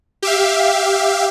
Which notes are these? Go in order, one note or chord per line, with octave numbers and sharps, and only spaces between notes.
G4 E5 F5